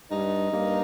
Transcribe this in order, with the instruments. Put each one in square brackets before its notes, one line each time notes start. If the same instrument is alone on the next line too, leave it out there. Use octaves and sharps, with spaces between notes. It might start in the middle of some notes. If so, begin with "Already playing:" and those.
[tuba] G2 [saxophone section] D#4
[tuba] G2 [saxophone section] A#3